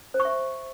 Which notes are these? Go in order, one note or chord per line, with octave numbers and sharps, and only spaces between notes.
C5
C#6
E5